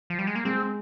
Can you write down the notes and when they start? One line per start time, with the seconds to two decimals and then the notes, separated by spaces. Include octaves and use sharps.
0.10 F3
0.19 G3
0.27 G#3
0.35 A#3
0.45 G#3 C4